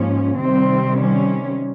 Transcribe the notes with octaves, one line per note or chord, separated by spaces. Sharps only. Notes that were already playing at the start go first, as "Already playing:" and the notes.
Already playing: G#2 F3 A#3 C#4
C3 D#3 G3 C4
C#4